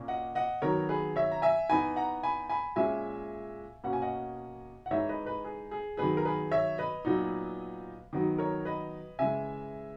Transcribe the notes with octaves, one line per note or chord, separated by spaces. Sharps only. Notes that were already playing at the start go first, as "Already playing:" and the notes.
Already playing: A#2 A#3 C#4
D#5 F#5
D#5 F#5
D#3 F#3 B3 A#4 C#5
G#4 B4
C#5 E5
A#5
E5 G#5
E3 B3 D#4 G#5 B5
F#5 A#5
G#5 B5
G#5 B5
A#2 G#3 C#4 E5 G#5
B2 A#3 C#4 F#5
G#5
D#5 F#5
F#5
E3 G#3 D#4 C#5 E5
B4 D#5
B4 D#5
G#4
G#4
D#3 F#3 B3 G#4 B4
A#4
G#4 B4
C#5 E5
B4 D#5
A#2 F#3 B3 D#4
D#3 F#3 B3 D#4
A#4 C#5
B4 D#5
C#3 E3 G#3 E5 G#5